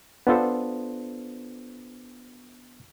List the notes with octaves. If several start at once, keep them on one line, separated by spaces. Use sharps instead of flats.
B3 D4 F4 A4 C5